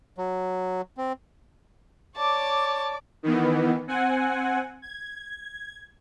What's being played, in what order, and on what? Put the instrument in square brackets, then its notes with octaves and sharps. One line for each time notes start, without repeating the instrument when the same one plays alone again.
[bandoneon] F#3
C4
[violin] C#5 A5 [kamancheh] D5 D6
[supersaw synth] D#3 E3 B3
C4 F#5 G#5
G#6